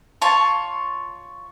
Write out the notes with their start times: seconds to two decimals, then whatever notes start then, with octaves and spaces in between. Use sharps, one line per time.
0.22 F4 C#5 A5